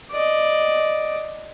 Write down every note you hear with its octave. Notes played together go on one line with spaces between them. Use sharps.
D5 D#5